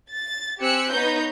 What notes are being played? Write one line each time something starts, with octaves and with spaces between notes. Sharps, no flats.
A6
C4 G4 G#5 E6 F#6 C#7
B3 D#4 B4 C#5 D#5 G6